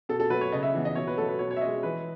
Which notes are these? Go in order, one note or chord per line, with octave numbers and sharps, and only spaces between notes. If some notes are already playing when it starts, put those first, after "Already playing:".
B2 A4
A4
F#3 A3 B4
C#5
C#3 D#5
E5
E3 B3
D#5
B2 C#5
B4
F#3 A3 A4
B4
B2 C#5
C#5
E5
G#3 C#4 D#5
E3 B4